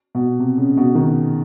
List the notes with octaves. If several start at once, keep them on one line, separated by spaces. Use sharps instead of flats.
B2
C3
C#3
B2
D#3